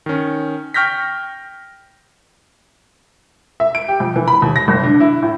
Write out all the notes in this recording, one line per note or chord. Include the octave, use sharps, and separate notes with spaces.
D#3 C#4
G5 C#6 F6 G6 A#6 B6
E5
D7
G4
F2
E3
B5
D#2
A#6
F#1
D3
E4
A2